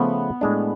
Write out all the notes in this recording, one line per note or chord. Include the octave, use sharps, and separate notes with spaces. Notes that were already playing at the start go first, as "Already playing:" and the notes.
Already playing: C#3 F3 A3 B3 F4
A2 G#3 D4